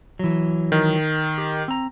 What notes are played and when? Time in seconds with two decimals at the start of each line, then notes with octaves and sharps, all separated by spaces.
0.19 E3 F#3
0.72 D#3
1.38 G4
1.68 C4 A#5